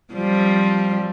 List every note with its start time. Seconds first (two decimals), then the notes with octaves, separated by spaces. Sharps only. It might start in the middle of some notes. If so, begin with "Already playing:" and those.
0.13 F3 G3 C4